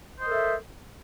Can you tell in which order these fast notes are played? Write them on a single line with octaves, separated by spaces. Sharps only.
C5 D#5 A#4 A4 E5